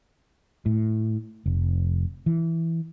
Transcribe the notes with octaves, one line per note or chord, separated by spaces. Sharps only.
A2
F1
E3